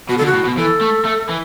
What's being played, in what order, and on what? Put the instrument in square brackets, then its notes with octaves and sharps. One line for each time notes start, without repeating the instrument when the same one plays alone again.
[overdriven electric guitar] B2 [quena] F#4
[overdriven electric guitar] D3 [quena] A4
[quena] F#4
[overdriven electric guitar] A2
B2
[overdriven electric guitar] E3 [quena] A4
[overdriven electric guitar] A3
A3
E3